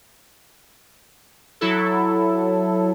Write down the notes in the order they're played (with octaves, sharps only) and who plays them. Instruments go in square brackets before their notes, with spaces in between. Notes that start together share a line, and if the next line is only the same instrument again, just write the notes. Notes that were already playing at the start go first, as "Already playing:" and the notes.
[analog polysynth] F#3 E4 A4